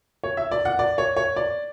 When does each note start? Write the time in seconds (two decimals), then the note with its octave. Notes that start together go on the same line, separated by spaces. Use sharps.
0.23 C#5
0.37 E5
0.51 D5
0.65 F#5
0.79 D5
0.98 C#5
1.16 C#5
1.36 D5